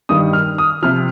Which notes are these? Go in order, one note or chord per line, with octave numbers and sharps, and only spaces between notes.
G2 D#3 G3 D#6
F6
D#6
C3 F3 F6